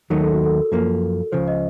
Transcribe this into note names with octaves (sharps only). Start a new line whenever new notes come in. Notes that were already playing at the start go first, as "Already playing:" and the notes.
D#2 D#3 F#3 A3 D#4 A#4
A4
F#4
A4
F#2 F3 A#3
C#2 C#3 F3 C5
D#5